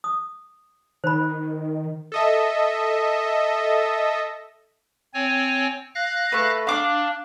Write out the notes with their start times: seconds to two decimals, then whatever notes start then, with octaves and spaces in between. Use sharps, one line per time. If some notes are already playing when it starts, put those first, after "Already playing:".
0.04 D#6
1.04 D#3 C5 B5
2.12 A4 D#5 E5
5.14 C4 C#5 G#5
5.95 F5 F#6 A#6
6.32 A3 B4
6.67 D4 F5 D6